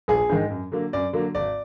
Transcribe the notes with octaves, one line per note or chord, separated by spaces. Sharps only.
A#1 G#4
G#2 D#3 G#3
F#2
D3 F#3 A#3
F#2 D5
D3 F#3 A#3
G#1 D5